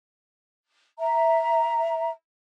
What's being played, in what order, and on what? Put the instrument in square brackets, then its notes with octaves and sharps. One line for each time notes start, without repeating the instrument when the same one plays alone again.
[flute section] E5 A#5